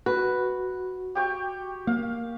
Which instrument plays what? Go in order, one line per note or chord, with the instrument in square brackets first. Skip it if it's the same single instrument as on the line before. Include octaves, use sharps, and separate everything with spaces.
[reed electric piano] F#4 [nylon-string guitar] B4
[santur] G4 G5 C#6
[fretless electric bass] A#3 [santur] F5